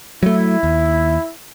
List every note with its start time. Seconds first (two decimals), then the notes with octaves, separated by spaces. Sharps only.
0.23 F#3 A3 E4
0.63 D#2